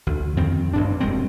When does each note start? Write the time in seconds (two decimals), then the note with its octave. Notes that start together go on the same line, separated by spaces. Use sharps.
0.07 D2
0.37 F2 D#3 C4
0.74 A1 G2 D4
1.00 E1 G3 G#3 C4